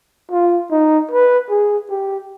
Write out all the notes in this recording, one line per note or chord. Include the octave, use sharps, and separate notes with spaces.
F4
D#4
B4
G#4
G4